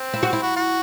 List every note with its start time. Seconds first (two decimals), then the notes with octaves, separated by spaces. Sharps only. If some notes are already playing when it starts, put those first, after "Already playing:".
Already playing: C4
0.14 E4
0.23 F#4
0.33 E4
0.42 F#4
0.56 F#4